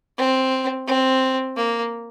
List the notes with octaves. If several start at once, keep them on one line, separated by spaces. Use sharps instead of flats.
C4
C4
A#3